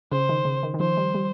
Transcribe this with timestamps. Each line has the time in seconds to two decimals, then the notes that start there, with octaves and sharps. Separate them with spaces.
0.12 C#3 C5
0.29 D#3
0.45 C#3
0.63 D#3
0.74 D#3
0.80 F3 C5
0.97 G3
1.14 G3